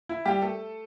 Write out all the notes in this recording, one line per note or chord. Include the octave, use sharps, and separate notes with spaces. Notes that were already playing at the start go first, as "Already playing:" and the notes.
E4
G3 G4
A3 A4